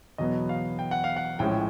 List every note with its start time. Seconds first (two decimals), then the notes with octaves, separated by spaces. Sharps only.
0.18 E2 B2 F#3 B3 D#5
0.49 F5
0.79 G5
0.91 F#5
1.04 F5
1.17 F#5
1.39 A#1 A2 F3 G#3 C#4 G5